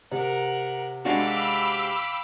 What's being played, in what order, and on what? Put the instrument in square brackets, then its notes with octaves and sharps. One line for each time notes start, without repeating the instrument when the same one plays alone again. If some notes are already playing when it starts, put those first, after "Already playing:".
[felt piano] C3 [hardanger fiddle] A#4 F#5
[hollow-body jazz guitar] G#3 D4 F#4 [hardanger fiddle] F5 G5 [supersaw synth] B5 D6 E6